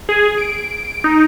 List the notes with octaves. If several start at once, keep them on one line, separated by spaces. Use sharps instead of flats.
G#4
D7
D#4